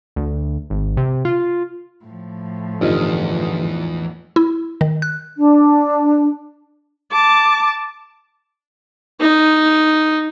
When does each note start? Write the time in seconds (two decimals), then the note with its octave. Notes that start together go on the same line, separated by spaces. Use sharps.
0.16 D2
0.70 G#1
0.97 C3
1.25 F4
2.05 A2 F3
2.81 G1 E2 D#4 F4 A4 D#5
4.36 E4
4.81 D#3
5.02 F#6
5.37 D4
7.11 A5 D6
9.21 D#4